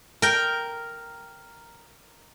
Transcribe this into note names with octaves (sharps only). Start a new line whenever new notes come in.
A#4 G5